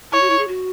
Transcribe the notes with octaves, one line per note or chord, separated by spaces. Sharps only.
E4 C#5
F#4
E4
G#4
F#4